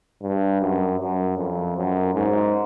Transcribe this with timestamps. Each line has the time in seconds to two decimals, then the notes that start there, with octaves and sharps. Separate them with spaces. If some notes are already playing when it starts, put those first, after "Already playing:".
0.23 G2
0.61 F#2
0.99 F#2
1.38 F2
1.77 F#2
2.15 G#2